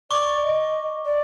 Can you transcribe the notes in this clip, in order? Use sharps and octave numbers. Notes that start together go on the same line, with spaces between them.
D5 C#6 D6
D#5
D5